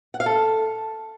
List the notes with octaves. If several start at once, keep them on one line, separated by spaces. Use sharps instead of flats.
F#5
F5
A4